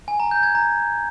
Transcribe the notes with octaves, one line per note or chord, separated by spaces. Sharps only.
G#5
A#5
G6
G#6
A#5